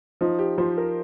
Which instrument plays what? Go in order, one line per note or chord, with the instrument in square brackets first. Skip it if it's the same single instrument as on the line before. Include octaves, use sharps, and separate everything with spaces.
[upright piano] F3 [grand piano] D#4
[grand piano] G4
[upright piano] F3 [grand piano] C5
[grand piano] A#4